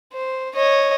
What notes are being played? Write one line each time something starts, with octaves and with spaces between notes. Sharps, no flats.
C5
C#5 D#5